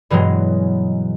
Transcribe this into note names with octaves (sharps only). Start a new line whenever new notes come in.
G2 B2 E3 F#3 G#3